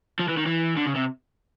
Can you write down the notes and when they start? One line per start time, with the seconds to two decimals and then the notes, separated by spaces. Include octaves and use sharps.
0.19 F3
0.28 E3
0.37 D#3
0.46 E3
0.76 D3
0.86 C#3
0.95 C3